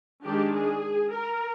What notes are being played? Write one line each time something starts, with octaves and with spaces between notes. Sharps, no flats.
D#3 G#3 D4 G4
G#4
A#4